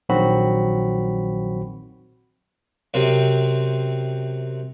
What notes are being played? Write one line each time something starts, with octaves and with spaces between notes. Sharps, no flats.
A#1 D#3 F#3 C4 F#4 B5
F#2 C3 C4